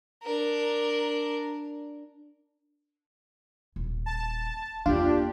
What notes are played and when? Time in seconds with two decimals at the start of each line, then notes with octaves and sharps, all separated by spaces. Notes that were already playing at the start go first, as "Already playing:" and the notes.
0.23 D4 A#4
3.76 D#1
4.06 A5
4.86 E2 A#3 D4 F4 G4